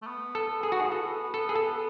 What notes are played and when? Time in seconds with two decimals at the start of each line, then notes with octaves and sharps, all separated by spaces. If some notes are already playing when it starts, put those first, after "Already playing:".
0.02 A3
0.07 B3
0.35 A4
0.63 G#4
0.72 F#4
0.80 G#4
0.92 A4
1.34 A4
1.49 G#4
1.56 A4